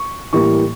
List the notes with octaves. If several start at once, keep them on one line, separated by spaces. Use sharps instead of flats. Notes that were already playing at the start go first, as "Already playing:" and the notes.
Already playing: C#6
A2 E3 G3 A#3 C#6